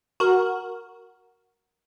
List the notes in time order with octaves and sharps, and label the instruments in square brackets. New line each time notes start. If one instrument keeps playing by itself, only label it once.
[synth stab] F#4 A#4